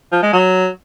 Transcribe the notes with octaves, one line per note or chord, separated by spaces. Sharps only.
F3
G#3
F#3